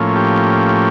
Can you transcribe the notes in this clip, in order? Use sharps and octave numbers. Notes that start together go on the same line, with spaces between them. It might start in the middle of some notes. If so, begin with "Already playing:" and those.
Already playing: A2 F3 A#3 C#4
G4